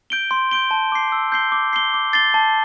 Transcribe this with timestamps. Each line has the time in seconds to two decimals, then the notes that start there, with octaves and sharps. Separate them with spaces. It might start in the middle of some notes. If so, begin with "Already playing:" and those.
0.10 G6 D7 G7
0.31 C6
0.51 G6 D7 G7
0.71 A5
0.92 D6 C7
1.12 E6
1.32 G6 C7 G7
1.52 D6
1.73 C7 G7
1.94 D6
2.13 A6 C7 G7
2.34 A5